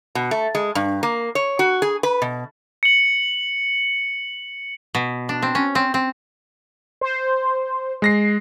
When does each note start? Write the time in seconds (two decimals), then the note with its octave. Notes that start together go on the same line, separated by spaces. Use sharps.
0.15 B2
0.31 A3
0.55 G#3
0.75 G2
1.03 A#3
1.35 C#5
1.59 F#4
1.82 G#4
2.03 B4
2.22 B2
2.83 C#7 F#7
4.95 B2
5.29 D4
5.42 C4
5.55 C#4
5.75 C4
5.94 C4
7.01 C5
8.02 G#3 A#6 C7